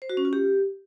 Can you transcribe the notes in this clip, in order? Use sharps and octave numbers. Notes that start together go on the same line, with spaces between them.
C5
F#4
C#4
F4
G4